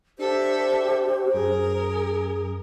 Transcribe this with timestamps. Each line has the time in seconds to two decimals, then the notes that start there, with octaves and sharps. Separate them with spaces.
0.19 D4 G4 A4 C5 E5
1.34 F#2 G#4 A#4